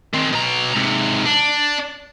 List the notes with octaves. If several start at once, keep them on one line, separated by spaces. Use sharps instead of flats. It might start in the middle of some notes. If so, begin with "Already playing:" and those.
D#3 C4
B2 A#5
G#2 C3
D4